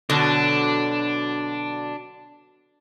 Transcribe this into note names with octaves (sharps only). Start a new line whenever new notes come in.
B2 D3 F#3 D4